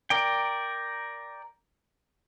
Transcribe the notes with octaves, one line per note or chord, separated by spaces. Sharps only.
A#4 D5 G5